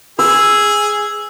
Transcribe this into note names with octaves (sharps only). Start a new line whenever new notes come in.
G#4 E6